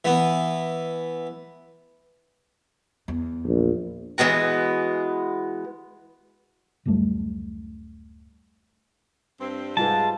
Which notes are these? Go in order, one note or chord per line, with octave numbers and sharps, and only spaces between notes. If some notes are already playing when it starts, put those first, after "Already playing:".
E3 B3
E2
A#1
E3 G#3 B3 F#4
D1 F#2 G3 A3
G2 C4
G#2 G3 F4 B4 A5